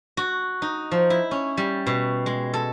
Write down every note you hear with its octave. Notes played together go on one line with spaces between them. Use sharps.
F#4
D#4
F3
E4
C#4
G3
B2
G#3
A4